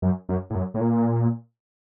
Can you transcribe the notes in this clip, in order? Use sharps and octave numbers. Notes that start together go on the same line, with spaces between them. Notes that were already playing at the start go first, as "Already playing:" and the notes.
F#2
F#2
A2
F#2
A2
A#2